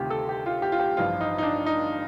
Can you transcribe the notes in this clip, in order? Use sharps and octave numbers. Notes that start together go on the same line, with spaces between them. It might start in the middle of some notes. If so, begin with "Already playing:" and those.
Already playing: D2 C3 D#3 F4 G4
A4
G4
F4
G4
F4
G4
A1 G2 F3 F4
D#4
D#4
D4
D#4